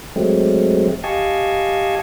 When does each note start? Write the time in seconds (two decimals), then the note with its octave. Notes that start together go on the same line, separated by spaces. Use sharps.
0.16 F#3 G#3 A3 C4
1.04 G4 D#5 F5 G#5 A5 C#6